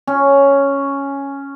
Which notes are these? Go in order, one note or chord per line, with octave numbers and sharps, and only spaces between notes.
C#4